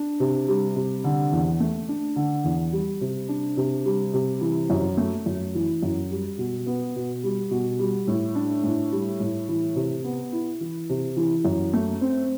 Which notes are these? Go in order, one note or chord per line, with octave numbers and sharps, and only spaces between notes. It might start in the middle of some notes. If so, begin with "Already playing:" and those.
Already playing: D4
C3
G3
C3
D3
E2
A3
D4
D3
E2
G3
C3
D4
C3
G3
C3
E3
F#2
A3
F#2
E3
F#2
G3
B2
B3
B2
G3
B2
G3
A2
D4
A2
G3
A2
E3
C3
B3
E4
E3
C3
E3
F#2
A3
C4